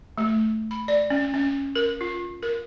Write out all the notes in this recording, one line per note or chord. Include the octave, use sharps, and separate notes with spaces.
A3
B5
D5
C#4
C#4
A#4
F4
A#4